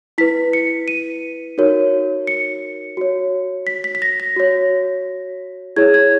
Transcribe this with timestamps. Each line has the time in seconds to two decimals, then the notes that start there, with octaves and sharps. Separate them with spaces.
0.18 E4 B4 B6
0.53 C#7
0.88 D#7
1.58 D#4 F#4 A#4 C#5
2.27 C#7
2.97 F#4 C#5
3.67 B6
3.84 B6
3.95 B6
4.02 A#6
4.20 A#6
4.36 F#4 C#5
5.76 E4 G#4 C#5 G#6
5.94 G#6